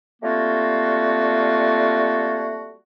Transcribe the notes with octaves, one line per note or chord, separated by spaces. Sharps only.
G3 A3 A#3 C4 F4 F#4